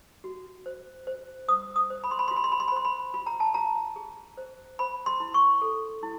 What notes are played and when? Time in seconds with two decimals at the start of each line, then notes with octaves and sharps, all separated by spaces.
0.24 F#4
0.66 C5
1.07 C5
1.48 C5 D#6
1.76 D#6
1.90 C5
2.04 B5
2.11 C6
2.19 B5
2.28 C6
2.31 F4
2.36 B5
2.44 C6
2.52 B5
2.60 C6
2.68 B5
2.72 C5 C6
2.85 B5
3.14 F4 B5
3.26 A#5
3.40 A5
3.54 F4 A#5
3.96 G#4
4.37 C5
4.79 C5 B5
5.06 C6
5.20 E4
5.34 C#6
5.62 A4
6.03 E4